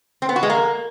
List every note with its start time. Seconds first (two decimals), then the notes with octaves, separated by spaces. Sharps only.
0.22 C4
0.29 B3
0.36 F#4
0.43 G#3
0.50 A#3